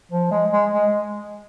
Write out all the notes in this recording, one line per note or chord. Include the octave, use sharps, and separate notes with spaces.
F3
G#3
G#3
G#3